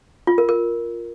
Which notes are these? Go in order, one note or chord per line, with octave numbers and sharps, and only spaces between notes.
F4
A#4
A#4